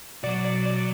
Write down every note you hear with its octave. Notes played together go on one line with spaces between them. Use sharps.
B2 F#3 F#4 D5